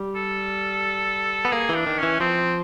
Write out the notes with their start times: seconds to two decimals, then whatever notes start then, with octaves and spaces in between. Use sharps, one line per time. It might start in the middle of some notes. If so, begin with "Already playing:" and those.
Already playing: G3
0.16 A4
1.45 B3
1.52 A#3 G#4
1.69 E3
1.75 D4
1.87 D#3
1.98 E3 C#4
2.20 F3 C4